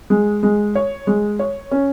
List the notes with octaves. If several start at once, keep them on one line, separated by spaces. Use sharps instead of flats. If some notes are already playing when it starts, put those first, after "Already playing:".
G#3
G#3
C#5
G#3
C#5
C#4